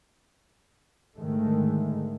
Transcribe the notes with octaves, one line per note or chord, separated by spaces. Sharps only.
G#2 D3 D#3 G#3 A3